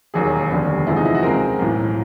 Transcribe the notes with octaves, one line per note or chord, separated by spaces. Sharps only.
E1 D#2 D#3 F#3 A#3 G#4
F1 D#2 D3 G3 B3
E2 C3 F3 G#3 E4
D#4
E4
F#4
C#2 B2 G#3 C4 A#4
B1 A2 E3